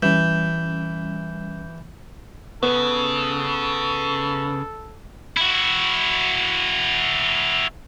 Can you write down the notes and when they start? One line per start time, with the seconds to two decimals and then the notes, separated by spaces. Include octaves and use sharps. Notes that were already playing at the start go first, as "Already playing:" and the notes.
0.03 E3 G3 C#4 G6
2.63 C#3 B3 A4
5.37 E4 F#4